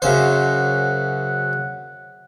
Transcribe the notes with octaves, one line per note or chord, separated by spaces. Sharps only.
F#2 C#3 C5 F#5